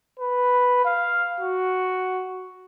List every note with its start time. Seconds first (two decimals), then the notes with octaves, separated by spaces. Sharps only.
0.19 B4
0.85 F5
1.40 F#4